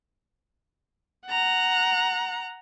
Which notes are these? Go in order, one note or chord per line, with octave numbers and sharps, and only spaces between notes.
F#5 A#5